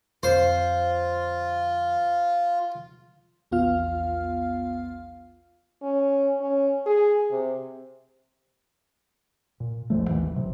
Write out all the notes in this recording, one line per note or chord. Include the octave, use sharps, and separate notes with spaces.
F2 D3 F4 C5
A#1 E2 B3 F4 F5 F6
C#4
C#4
G#4
C3
A#2
E1 A1 F3 A3
G#1 D#2 E3
A1 C3 F#3